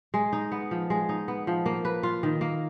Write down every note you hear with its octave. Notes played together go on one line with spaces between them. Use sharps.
G#3
D#4
B3
F3
G#3
D#4
B3
F3
A#3
B4
F4
D#3
A#3